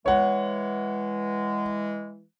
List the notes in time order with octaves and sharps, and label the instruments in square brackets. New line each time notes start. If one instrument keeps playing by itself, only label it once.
[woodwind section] E3 G#3 [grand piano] C#5 F#5